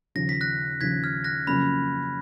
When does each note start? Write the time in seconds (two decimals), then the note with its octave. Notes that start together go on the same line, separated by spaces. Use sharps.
0.15 D#2 C#3 F3 A#6
0.29 B6
0.41 F#6 A#6
0.81 D#2 C#3 F3 G#6 B6
1.03 F6 G#6
1.24 F#6 A#6
1.47 F2 C#3 F#3 A#3 C#4 B5